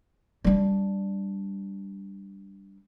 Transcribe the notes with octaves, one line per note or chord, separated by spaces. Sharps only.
G3 D4